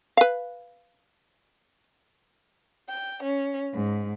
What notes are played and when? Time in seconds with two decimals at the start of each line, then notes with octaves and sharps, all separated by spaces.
0.17 B4 F5
2.88 G5
3.22 C#4
3.73 G#2